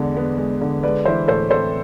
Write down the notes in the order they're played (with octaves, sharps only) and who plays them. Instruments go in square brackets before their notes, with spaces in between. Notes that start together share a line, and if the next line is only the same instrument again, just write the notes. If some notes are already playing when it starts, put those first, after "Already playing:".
Already playing: [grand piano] E2 D3 G#3
B3
G#3
D3
G#3 B4 D5
E3 C5 E5
A2 A4 C5
C4 A4 C5